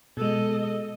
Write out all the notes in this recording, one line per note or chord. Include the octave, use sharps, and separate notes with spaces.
B2 G#3 A4 D#5